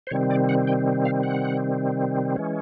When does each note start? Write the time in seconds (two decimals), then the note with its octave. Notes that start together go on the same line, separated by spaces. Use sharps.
0.07 C5
0.11 C3 D#3 G3 C4 C#5
0.30 D5
0.49 F#5
0.67 G5
1.05 F5
1.23 F#5
2.36 E3 G#3 C#4